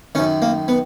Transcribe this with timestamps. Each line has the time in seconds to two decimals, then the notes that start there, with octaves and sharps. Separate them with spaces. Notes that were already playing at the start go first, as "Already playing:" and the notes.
0.15 D#3 C#4
0.19 F#2
0.42 A#3
0.68 B3